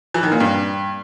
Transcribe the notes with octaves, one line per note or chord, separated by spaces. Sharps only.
E3
D#3
A#2
G2